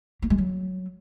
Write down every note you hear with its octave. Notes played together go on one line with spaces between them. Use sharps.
A#3
G#3
F#3